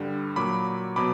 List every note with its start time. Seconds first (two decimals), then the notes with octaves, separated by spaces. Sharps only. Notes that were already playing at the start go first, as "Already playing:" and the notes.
Already playing: G2 D3 G3
0.36 A#2 F#3 B5 D6
0.96 B2 F#3 B5 D6